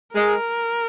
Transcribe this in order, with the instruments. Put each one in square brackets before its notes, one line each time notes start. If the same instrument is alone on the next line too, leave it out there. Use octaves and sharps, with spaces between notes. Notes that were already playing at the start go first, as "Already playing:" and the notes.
[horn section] G#3 [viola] A#4